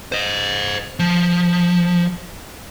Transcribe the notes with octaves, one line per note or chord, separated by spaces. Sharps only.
C5 D#5
F3